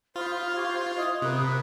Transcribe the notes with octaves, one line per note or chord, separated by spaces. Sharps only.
F4 C5 B5 D#6 F6
G4 C#6 G#6
E4 D#5 D#6
C3 A#4 B5 F#6